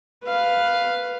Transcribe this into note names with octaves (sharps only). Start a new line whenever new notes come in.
B4 F5